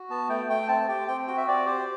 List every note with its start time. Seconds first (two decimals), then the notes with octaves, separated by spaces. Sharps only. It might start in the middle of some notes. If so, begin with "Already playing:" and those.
Already playing: F#4
0.10 B3 A5
0.29 A3 G5
0.49 A3 G5
0.68 C4 A5
0.89 G4 G5
1.08 C4 G5
1.27 F#4 G5
1.37 E5
1.48 C4 D5
1.66 G4 C5